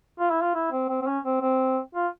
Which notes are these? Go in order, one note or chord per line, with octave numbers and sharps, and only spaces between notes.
F4
E4
F4
E4
C4
C4
C4
C#4
C4
C4
F4